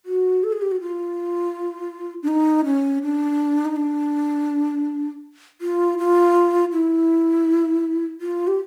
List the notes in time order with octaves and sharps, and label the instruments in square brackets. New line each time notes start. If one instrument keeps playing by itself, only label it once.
[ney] F#4
A4
G#4
G4
F#4
F4
D4
D#4
C#4
D4
D#4
D4
F4
F4
E4
F4
G4